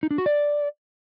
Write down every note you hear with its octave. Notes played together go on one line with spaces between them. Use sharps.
D#4
D4
F#4
D5